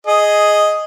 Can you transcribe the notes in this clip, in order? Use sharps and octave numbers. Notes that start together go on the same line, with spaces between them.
G#4 D#5